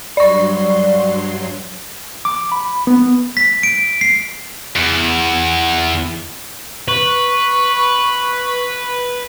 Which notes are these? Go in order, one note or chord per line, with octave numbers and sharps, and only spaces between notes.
G2 F#3 D5 C6 C#6
D6
B5
B3
B6
D7
C7
E2
B4 C#6